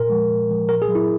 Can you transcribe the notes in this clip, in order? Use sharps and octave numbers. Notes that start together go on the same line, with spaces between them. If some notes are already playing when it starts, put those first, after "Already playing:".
Already playing: A#2 A#4
F3 G#3
A#2
F3 G#3
A#2 A#4
G#4
F#3
E4